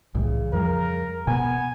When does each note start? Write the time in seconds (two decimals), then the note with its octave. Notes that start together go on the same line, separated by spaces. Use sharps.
0.15 C2 A2 C#3 E3
0.53 F2 F3 G3 A#4
1.27 B2 B3 G#5